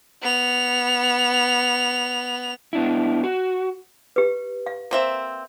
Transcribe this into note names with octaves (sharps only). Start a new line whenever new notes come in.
B3 F7
B3 D4 E4
F#4
G4 B4
F5
A#3 C4 E5